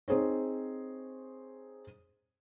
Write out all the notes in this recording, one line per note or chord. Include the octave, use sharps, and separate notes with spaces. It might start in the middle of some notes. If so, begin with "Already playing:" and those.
C4 D#4 G#4 C5 C#5